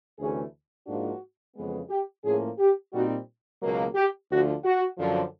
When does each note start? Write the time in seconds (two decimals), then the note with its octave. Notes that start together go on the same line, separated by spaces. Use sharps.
0.18 D2 C3 E3 A3 C#4 G#4
0.86 G#2 F3 A#3 D4 F4 F#4
1.55 F2 C#3 E3 G#3 B3
1.89 G4
2.24 A2 F3 A#3 C#4 G#4
2.59 G4
2.93 A#2 G3 C4 D#4 F#4
3.61 C#2 B2 F#3 A#3
3.95 G4
4.29 D2 D3 F3 F#4
4.63 F#4
4.98 F#2 D3 F3